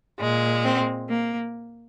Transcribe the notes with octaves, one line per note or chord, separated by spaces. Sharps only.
A#2 G#3
C4
A#3